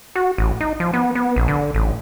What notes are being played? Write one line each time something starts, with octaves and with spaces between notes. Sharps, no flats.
F#4
A1
D#4
F3
B3
B3
A#1
D3
A1